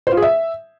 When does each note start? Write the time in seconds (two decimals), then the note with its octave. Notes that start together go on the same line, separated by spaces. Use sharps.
0.07 C5
0.12 F4
0.17 G#4
0.22 E5